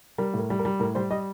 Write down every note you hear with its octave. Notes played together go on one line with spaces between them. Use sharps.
G3 A#4
A2
A#4
G3
A#4
G3
A2 A#4
G3 C5
G3 D#5